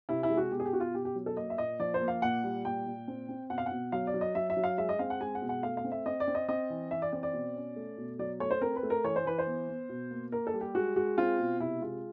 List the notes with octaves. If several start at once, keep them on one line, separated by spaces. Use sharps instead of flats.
C3 E4
E4
G#3
F#4
B2 G4
G#4
G4
B2 F#4
F4
B2 G4
G4
F#3
A4
A#3 D#5
E5
A#2 D#5
F3 D5
C5
A#3
F5
A#2 F#5
G3
A#2 G5
A#2
C4
C4
B2 F#5
F5
F#5
B2
F#3 F5
D5
F#3
D#5
F#3 E5
E5
F#3
F5
G#3 E5
D#5
C4 F5
F#5
G#3 G#5
F#5
B2
F#5
A3 F5
F5
C4
E5
C4 D#5
D5
C4
D#5
C4 D#5
E3
E3 E5
D5
C4 D5
D5
B2
C#4
A3
B2
F#3 D5
A3 C#5
C5
C4 A#4
B4
A3
A#4
E3 C#5
C5
E3 B4
C5
B3
B3
B2
A#3
A#3 A#4
A4
G3
G4
G#3 F#4
G#3 F#4
C4 F4
B2
C3 E4
G#3 F4